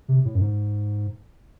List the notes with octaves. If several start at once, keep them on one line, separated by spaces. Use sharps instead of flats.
C3
A2
F#2
G#2